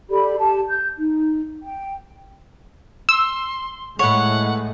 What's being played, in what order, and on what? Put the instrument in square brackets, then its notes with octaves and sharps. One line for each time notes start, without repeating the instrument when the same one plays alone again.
[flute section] G4 A4 D5 B5
G4 A5
G6
D#4
G5
[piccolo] C6 [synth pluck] E6
[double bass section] A2 G#3 A3 [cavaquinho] B4 C#5 [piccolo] F#5